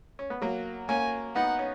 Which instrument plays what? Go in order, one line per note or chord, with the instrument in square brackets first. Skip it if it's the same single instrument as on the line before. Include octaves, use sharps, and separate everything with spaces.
[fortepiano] C#4
B3
F#3 A#3
[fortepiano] A#3 C#4 [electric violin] G#5
[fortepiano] B3 D#4 [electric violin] F#5
[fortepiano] C#4